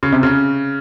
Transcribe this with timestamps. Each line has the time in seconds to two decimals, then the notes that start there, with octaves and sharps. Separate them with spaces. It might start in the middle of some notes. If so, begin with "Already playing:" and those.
0.03 C#3
0.12 C3
0.23 C#3